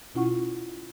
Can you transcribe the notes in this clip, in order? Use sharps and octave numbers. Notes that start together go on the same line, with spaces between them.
B2 C#4 E4 F4 F#5 C#6